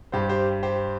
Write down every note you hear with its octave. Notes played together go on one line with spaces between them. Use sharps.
G2 G3 G4 C5
G4 C5
G4 C5